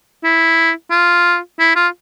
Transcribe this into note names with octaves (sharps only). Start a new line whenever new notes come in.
E4
F4
E4
F4